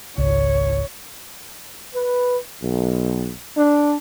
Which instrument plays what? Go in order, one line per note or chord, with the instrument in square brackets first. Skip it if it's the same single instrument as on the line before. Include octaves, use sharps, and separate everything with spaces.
[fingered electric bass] G#1 C#2 [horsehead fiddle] C#5
[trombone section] B4
B1
D4